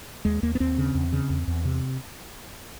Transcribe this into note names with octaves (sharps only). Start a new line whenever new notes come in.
D#2 G#3
D#2 A#3
B3
D#2 C4
C#3
E2
C#3
E2
E2
C3